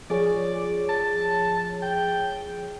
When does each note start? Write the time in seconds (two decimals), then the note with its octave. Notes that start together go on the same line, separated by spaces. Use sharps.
0.10 F3 G#4 C#5 D5
0.89 A5
1.82 G5